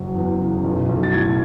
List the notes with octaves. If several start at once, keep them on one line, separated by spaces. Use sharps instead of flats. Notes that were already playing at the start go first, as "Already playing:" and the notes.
Already playing: F#1 F#3
E2
C#3
B1
B1
A6
A2 G#6